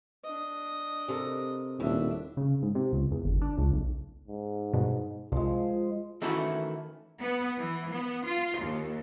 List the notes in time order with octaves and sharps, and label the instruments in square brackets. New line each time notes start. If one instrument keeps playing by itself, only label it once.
[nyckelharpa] D4 D#5
[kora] C3 A4 A#4
[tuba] D#1 [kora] A2 [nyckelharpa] D4 E5
[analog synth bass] C#3
G#2
C3
C#2
E2
G1
D4
C#2
B1
[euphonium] G#2
[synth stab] G2 B2
[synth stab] C2 [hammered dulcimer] F3 G#3 [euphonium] F4
[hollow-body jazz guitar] D#3 E3 A3 C#4 E4 F#4
[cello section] B3
E3
B3
F4
D#2